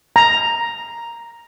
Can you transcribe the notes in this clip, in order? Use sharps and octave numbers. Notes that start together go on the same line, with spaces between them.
A#5